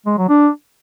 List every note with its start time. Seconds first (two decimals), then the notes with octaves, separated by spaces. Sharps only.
0.06 G#3
0.18 F#3
0.29 D4